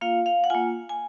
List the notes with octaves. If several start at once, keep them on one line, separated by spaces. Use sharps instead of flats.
A#3 F4 F5
F5
F#5
A#3 F4 G#5
G#5